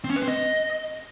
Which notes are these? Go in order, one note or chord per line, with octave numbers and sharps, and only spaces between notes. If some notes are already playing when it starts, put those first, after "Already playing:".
C4
C#4
B4
C4
D#5